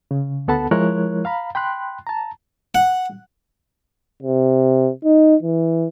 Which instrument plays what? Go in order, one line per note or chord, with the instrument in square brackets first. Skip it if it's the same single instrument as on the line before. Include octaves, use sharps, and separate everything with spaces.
[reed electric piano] C#3
D2 B3 A4 F#5 A5 B5
F3 G#3 E4 A#4 C#5 F#6
F5 A#5 B5
G5 B5 C6 F#6
A5 A#5
[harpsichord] F#5
[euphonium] C3
D#4
E3